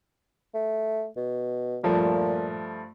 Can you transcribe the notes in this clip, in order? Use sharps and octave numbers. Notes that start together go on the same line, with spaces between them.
A3
B2
G2 A#2 F3 A3